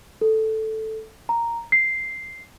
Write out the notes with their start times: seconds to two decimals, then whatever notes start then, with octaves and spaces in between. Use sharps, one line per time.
0.21 A4
1.29 A#5
1.72 C7